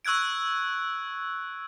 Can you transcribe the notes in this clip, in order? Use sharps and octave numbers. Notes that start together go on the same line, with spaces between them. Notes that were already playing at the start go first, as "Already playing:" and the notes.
C#6 E6 F#6 G#6 D7